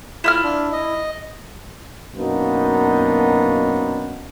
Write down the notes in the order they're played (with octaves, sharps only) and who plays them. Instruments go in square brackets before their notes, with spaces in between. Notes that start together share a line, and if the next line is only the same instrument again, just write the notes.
[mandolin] E4 E6 F6 [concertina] F4
[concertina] D4
D#5
[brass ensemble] F#2 B2 A#3 B3 D4 D#4